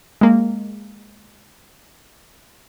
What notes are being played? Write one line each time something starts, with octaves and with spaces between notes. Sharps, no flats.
G#3 A#3